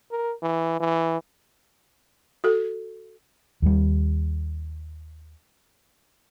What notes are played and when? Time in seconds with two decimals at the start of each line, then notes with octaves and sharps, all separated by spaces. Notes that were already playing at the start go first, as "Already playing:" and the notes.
0.11 A#4
0.42 E3
0.80 E3
2.44 F#4 A4
3.62 D#2 G3